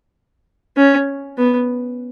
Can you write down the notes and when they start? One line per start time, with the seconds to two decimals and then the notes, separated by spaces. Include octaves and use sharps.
0.77 C#4
1.37 B3